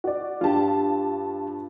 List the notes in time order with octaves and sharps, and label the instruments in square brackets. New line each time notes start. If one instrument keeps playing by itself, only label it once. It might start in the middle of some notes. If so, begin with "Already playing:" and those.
[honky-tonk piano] F#4 D5
[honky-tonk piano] G2 A5 [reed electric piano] F4 G4